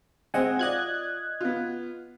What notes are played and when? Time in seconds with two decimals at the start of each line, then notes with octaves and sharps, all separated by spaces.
0.34 G#3 C4 C5 D#5 F#5 G#5
0.59 F4 D5 D#5 F#6 G#6
1.41 B3 F4